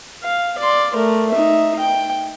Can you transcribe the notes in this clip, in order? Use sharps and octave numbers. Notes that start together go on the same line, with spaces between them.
F5
D5 C6
A3 A#4
D#4 E5
G5